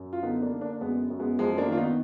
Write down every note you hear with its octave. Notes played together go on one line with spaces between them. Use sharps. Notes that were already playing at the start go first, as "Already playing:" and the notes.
Already playing: F#2
F4
D3 B3 D#4
A#3 D4
D3
A#3 D4
D4
F#2 G#3 B3
F#2
G#3 B3
F#2 F3 G#3
A#3 D4
D#3 F4
B3 D#4